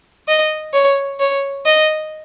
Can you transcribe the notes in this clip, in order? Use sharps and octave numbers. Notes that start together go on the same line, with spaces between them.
D#5
C#5
C#5
D#5